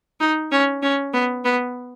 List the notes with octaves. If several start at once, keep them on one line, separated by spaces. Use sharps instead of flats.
D#4
C#4
C#4
B3
B3